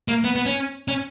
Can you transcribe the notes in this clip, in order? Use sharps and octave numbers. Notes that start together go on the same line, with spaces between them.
A#3
B3
B3
C#4
C#4